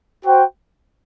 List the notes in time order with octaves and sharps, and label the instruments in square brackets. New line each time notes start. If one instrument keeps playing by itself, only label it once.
[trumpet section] F#4 C5 G5